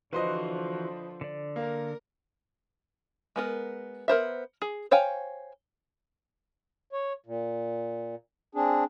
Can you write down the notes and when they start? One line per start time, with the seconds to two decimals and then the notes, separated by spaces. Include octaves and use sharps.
0.13 D3 E3 F3 F#4 B4 C5 D#5
1.21 D3 D5
1.56 A#3 A#4
3.36 G#3 B3 A#4
4.08 B3 A#4 C5 E5
4.62 G#4
4.91 C5 C#5 F5 G5 G#5
6.92 C#5
7.26 A#2
8.55 C4 D4 G#4